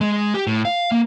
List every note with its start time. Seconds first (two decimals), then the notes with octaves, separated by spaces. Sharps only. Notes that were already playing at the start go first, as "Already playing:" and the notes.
0.01 G#3
0.34 G4
0.47 A2
0.65 F5
0.92 A#3